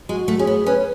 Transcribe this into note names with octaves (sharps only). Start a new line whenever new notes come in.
G#3 F#4
A3
C#4 G#4
B3
C#4 B4